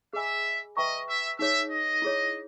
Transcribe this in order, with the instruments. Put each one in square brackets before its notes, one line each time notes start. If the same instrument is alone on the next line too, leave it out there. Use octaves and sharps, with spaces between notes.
[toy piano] G#4 D#5 G#5 B5 [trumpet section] E5
[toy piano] B4 E5 G5 A#5 C#6 [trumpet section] D#5
[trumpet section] E5
[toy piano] D#4 G#4 C#5 [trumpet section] E5
[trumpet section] D#5
[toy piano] E4 G#4 C#5